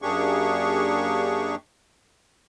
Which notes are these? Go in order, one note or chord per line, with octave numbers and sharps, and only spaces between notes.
F#2 A#3 D4 G4 G#4 C#6